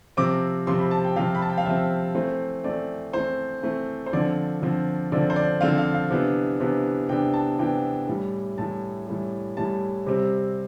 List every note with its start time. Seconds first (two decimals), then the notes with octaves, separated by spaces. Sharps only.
0.17 C3 F3 C4 D6
0.67 C3 F3 C4 C6
0.79 B5
0.91 A5
1.04 G5
1.16 C3 F3 C4 F5
1.35 B5
1.42 A5
1.50 G5
1.58 F5
1.66 C3 F3 C4 E5
2.15 E3 A3 C4 C5
2.64 E3 A3 C4 D5
3.13 E3 A3 C4 C5
3.63 E3 A3 C4
4.06 C5
4.13 D3 F3 C4 D5
4.62 D3 F3 C4
5.12 D3 F3 C4 D5
5.30 C5
5.36 D5
5.61 D3 F3 C4 F5
5.78 F5
5.94 F5
6.10 C3 E3 B3 D4
6.60 C3 E3 B3 D4
7.09 C3 E3 B3 D4 G5
7.34 A5
7.58 C3 E3 B3 D4 G5
8.08 A2 E3 G3
8.58 A2 E3 G3 A5
9.07 A2 E3 G3
9.57 A2 E3 G3 A5
10.06 C3 G3 C4